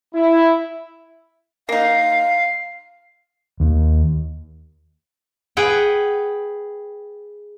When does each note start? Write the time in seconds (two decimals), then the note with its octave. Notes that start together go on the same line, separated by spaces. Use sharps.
0.15 E4
1.69 A#3 D#4 F5 C7
3.60 D#2
5.57 G#4 B4 F#5 G5